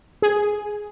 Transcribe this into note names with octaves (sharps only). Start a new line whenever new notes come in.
G#4